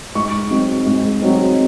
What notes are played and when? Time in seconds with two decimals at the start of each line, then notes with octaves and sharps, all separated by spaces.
0.15 G#2 C#6
0.50 F#3 C4 D#4
0.86 G#2
1.21 F#3 C4 D#4